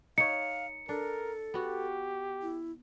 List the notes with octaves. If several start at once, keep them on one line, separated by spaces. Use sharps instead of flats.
D#4 C#5 F5 C#7
D4 A4 A#4
B3 F#4 G4
E4